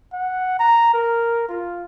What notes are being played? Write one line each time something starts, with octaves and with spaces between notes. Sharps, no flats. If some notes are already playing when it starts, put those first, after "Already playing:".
F#5
A#5
A#4
F4